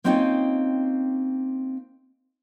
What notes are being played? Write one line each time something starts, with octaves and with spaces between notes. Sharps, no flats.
A#3 C4 C#4 D#4 F4 G5